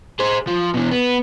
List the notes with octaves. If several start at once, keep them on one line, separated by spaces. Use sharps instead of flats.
G#4 C5
F3
B2 E3
B3